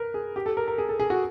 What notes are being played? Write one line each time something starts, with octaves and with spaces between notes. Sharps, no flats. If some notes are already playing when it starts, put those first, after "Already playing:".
Already playing: A#4 B4
G#4
G4
A4
A#4
A#4
G#4
A4
G#4
F#4